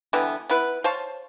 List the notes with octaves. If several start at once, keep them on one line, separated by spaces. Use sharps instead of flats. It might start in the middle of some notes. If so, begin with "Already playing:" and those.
D3 E3 G3 B3
B3 E4 B4
C5 C#5 F5 A5